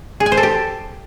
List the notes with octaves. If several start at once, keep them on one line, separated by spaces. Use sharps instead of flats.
G#4
G#5
C5
A4
G4